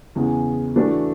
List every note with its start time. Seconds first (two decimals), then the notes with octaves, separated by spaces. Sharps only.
0.15 E2 C#3 G#3
0.76 E3 A3 D4 F#4 A4